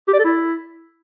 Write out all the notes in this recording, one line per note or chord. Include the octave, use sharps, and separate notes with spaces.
G4
D5
A4
E4